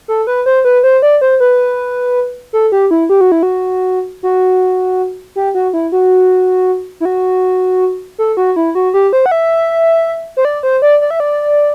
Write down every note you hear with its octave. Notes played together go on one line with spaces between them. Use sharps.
A4
B4
C5
B4
C5
D5
C5
B4
A4
G4
E4
G4
F#4
E4
F#4
F#4
G4
F#4
E4
F#4
E4
F#4
A4
F#4
E4
F#4
G4
C5
F#5
E5
C5
D5
C5
D5
D5
E5
D5